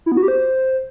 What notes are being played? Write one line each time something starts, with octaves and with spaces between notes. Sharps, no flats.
E4
B3
F#4
G4
C5